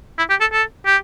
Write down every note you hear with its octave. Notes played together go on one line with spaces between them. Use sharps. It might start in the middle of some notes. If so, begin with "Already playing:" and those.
E4
G4
A4
A4
G4